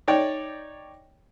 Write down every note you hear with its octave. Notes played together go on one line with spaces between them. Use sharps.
D#4 C#5 D5 G5